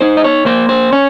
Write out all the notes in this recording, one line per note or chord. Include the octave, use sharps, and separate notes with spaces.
D#4 C5
D#5
C#5
A#3 C5
C5
C#4 C#5